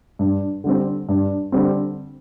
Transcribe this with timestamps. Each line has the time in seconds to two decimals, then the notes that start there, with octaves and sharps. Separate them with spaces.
0.19 G2
0.64 D3 G3 C4
1.09 G2
1.52 D3 G3 C4